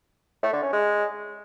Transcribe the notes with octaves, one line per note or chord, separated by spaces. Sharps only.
A3
D3
C#4
G#3